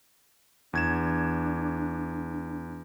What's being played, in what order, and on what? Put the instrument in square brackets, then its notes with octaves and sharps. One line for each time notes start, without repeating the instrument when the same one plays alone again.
[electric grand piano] E2 G#6 E7 [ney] D4